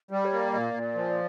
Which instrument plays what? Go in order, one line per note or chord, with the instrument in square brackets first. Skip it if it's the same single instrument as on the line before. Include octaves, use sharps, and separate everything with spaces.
[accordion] G3 [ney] G4
[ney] C#5
[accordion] A#3
[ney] D5
[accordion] A#2 [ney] D5 D#5
[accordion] A#2
F3